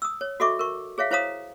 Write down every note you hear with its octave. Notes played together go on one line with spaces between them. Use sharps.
D#6 E6
C#5
F#4 A4 D#5 E5 C#6 D6
A#4 C#6
G#4 C#5 E5 F5
E4 C5 C#5 F5 A#5 D#6